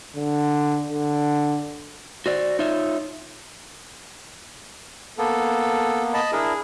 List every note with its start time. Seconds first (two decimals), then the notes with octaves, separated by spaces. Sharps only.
0.16 D3
0.89 D3
2.26 F#4 C5 D5
2.59 D#4 F4 C#5 E5
5.18 A#3 B3 A4
6.14 D#5 A5 B5
6.32 D4 E4 G#4 A#4